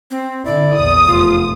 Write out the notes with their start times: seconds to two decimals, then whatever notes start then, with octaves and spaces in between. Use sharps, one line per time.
0.11 C4
0.45 D3 E4 D5
0.77 A#1 E2 D#6
1.07 F1 F4